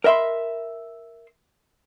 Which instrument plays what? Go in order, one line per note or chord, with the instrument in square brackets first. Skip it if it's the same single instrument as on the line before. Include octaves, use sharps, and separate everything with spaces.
[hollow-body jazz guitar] A#4 D#5 E5 B5 C6